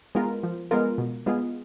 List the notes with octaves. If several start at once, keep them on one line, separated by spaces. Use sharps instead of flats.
G#3 B3 F4 A#4
F3
G#3 B3 F4 A#4
B2
G#3 B3 F4 G#4